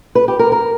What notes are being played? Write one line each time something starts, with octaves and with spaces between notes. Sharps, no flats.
B4
G4
A#4
A#4